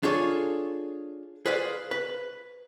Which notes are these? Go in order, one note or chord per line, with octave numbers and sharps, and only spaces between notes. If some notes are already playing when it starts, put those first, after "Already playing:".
D4 F4 G#4 A4 C#5
G#4 B4 C5 D5 F5
B4